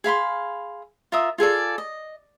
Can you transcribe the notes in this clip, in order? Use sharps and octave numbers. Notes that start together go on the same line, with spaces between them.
G#4 F5 B5 C6
F4 A#4 E5 D#6
F4 G#4 A4 D5
D#5